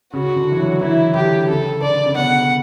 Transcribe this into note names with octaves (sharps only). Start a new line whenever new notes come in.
C#3 F#4
D3
E3
F#3
E3 E4
D3 G4
C#3 A4
D3 D5
C#3
B2 F#5